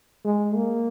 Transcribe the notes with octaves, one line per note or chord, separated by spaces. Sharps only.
G#3
A#3